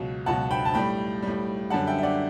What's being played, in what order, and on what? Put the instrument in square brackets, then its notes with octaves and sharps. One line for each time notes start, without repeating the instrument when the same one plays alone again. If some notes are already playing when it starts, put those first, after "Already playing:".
Already playing: [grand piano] C#2 B2 F#3
C#2 B2 F#3 F#5 A5
G5 B5
A5
A2 G3 G5 B5
A2 G3
F#2 D3 G3 F#5 A5
E5 G5
E5
D5 F#5